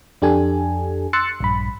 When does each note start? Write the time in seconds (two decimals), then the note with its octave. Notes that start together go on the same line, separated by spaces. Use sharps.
0.22 F2 D4 G4 A4 G#5
1.13 C6 E6 F#6 A6 C#7
1.40 A#1 G2 B5